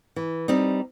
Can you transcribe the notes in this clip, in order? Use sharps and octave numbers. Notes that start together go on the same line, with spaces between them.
E3
G3 C4 D#4